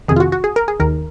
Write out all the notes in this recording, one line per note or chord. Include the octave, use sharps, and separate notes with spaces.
F2 C3 D#3 G#4
F4
F#4
F#4
G#4
A#4
G#4
D#2 D#3 A#4